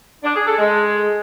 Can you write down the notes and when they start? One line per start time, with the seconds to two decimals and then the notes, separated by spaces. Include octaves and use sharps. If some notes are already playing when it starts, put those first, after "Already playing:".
0.23 D4
0.35 G#4
0.47 A4
0.58 G#3